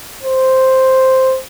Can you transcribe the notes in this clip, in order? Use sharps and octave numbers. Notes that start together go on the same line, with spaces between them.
C5